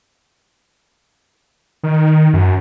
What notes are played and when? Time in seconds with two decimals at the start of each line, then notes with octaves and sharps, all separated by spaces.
1.83 D#3
2.34 F#2